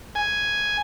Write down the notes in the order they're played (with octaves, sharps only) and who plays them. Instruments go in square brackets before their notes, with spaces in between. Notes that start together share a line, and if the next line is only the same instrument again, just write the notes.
[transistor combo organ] G#5